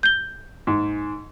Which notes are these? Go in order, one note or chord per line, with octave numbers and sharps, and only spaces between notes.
G6 G7
G#2